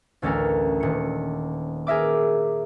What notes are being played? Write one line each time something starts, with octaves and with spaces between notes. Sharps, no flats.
A1 D2 C#4 A4 A#4
D#1 C#7
G#4 A#4 E5 D6